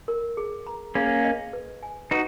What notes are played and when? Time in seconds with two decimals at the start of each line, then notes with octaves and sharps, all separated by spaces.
0.08 A#4
0.37 G#4
0.67 A#5
0.95 A#3 C#4 G#4
1.24 D#5
1.53 B4
1.83 G#5
2.11 D#4 F#4 B4